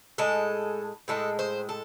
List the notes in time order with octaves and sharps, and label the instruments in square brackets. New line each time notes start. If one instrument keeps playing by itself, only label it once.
[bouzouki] A2 G#3 A4
A2 G#3 A4
C5
A4